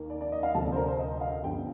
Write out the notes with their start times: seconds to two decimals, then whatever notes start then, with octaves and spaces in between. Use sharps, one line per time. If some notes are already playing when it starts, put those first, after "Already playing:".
Already playing: D#2 D#3 A#3
0.10 D5
0.21 D5
0.32 D#5
0.43 F5
0.54 D2 C3 F3 A3 A5
0.65 D5
0.72 C5
0.76 A#4
0.88 C5
0.99 D#5
1.17 D#5
1.21 F5
1.44 G1 G2 D3 G3 G5